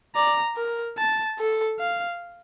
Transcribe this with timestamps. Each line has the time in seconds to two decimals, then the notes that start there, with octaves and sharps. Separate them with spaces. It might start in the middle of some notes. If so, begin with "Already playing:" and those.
0.16 D5 A#5
0.57 A#4
0.98 A5
1.39 A4
1.79 F5